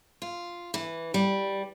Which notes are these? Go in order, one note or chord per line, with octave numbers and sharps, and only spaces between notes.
F4
E3
G3